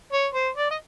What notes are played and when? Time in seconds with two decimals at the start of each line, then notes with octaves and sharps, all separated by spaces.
0.12 C#5
0.34 C5
0.56 D5
0.71 D#5